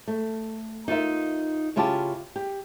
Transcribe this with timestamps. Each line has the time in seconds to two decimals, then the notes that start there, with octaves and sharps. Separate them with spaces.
0.08 A3
0.88 D#4 F4 A#4 E5
1.76 C#3 C#4 E4 F4 G4 A5
2.36 G4